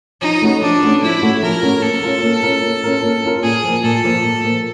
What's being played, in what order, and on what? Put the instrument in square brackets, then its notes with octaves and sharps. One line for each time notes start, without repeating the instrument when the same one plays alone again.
[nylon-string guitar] F3 [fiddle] D#4
[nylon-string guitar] A3 C#4 F#4 B4
[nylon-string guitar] F3 [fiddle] D4
[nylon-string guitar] A3 C#4 F#4 B4
[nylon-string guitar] F3 [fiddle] E4
[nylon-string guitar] A3 C#4 F#4 B4
[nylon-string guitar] F3 [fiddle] A#4
[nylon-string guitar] A3 C#4 F#4 B4
[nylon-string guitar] A#3 [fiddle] A4
[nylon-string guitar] C#4 F4 A#4
A#3
C#4 F4 A#4
A#3
C#4 F4 A#4
A#3
C#4 F4 A#4
[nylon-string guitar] A#2 [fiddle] G#4
[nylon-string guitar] F3 A#3
[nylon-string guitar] A#2 [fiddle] A4
[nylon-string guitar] F3 A#3
A#2
F3 A#3